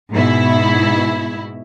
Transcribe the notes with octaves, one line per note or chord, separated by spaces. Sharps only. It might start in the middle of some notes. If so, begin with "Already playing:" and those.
G#2 B2 E4